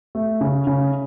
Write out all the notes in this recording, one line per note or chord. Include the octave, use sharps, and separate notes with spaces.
A3
C#3
C#3